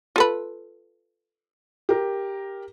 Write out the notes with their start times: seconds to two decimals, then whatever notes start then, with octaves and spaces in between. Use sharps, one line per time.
0.16 F4 A4 B4
1.89 G4 A#4